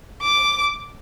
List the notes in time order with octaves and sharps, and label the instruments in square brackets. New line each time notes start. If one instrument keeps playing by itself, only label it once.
[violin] D6